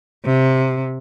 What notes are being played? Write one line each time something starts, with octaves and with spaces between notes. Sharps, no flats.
C3